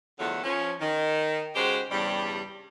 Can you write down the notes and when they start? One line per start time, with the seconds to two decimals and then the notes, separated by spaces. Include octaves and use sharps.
0.19 E2 D3 F3 F#3 A3 F#5
0.44 F3 C#4
0.80 D#3
1.55 C#3 G#3 F#4 G4 C5
1.91 E2 G2 C#3 G3